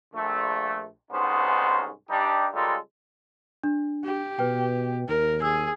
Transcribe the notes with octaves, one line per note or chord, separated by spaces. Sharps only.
A#1 A3
C2 G#2 B3 C#4 D#4 C5
G2 G3 D4 D#4 G4
C#3 G3 G#3 F4 A4 A#4
D4
G4
B2 B4 G5
D#2 A#4
G#4 E6